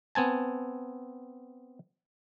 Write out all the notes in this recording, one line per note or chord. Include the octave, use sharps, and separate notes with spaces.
B3 C4 G#5 A5